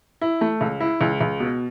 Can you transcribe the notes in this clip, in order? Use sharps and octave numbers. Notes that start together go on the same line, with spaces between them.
E4
A3
C#2
E4
C#2
C#2
B2